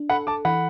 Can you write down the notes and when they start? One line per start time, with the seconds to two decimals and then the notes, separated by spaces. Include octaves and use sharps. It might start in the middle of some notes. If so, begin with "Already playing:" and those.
Already playing: D4
0.10 A4 F#5 B5
0.27 A5 D6
0.45 E3 F#5 B5